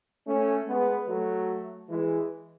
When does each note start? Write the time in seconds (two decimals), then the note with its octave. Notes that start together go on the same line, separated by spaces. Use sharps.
0.25 A3 C#4
0.66 G#3 B3
1.07 F#3 A3
1.89 E3 G#3